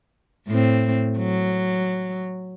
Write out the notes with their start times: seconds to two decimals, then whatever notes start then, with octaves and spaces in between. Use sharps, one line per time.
0.47 A2 C4
1.18 F#3